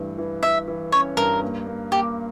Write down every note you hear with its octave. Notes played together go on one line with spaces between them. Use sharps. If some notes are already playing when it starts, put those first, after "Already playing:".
Already playing: G2 E3 A3
E3
E3 E5
E3
C#4 C#5
G2 A#4
A#3
A#3
A#3 G4